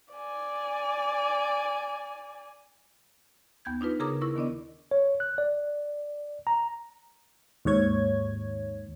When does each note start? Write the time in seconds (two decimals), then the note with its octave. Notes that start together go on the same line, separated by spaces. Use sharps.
0.14 D5 G#5
3.65 D#2 B3 G6 G#6
3.81 D4 D#4 F4 B4
4.00 C#3 G#4 A#4 A#5 D6 D#6
4.21 E4 A#4 C#6
4.36 D#3 B3 D4 D5 D#5
4.91 C#5
5.20 F#6
5.38 D5
6.47 A#5
7.65 D#2 G#2 C#5 G#6